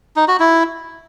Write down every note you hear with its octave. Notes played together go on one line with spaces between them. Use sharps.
D#4
F#4
E4